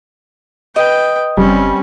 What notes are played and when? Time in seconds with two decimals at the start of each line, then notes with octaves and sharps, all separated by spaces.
0.76 B4 D#5 G5
1.37 F#1 G3 C4 C#4